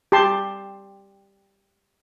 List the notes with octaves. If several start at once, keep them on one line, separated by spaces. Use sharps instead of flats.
G4 A5 C6